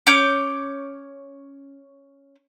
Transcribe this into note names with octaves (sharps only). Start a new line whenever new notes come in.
C#4 C#5 D6 G6